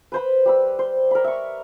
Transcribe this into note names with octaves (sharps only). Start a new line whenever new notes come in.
B4 C5 B5
G3 B5 E6
C5
A#4 B5
E5 C#6